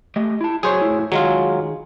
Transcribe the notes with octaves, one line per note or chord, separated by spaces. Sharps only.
A3 G4 D#5
E4 A5
F#3 G#4 C5 C#5
A2 E4
D#3 F#3 G#3 F4 G#4